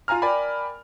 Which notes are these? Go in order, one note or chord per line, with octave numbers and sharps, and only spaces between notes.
F4 F5 G#5 A#5 F6
A#4 D5 G5 G#5 B5